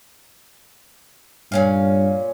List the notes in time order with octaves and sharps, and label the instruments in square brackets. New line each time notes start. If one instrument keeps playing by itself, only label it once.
[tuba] G2 [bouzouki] A#2 C#4 F5